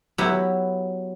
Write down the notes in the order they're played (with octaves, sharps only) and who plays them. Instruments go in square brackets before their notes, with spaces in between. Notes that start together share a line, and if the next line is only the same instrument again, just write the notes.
[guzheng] F#3 B3 E4 G4